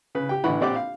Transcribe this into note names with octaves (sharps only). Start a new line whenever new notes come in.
C#3 B4
G4 G5
A1 D3 E3 F#5 B5 C#6
A#1 C4 G4 D5 F#5 D6
F5